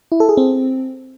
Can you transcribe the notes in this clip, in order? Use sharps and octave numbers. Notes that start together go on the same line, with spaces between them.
E4
A4
G#4
C4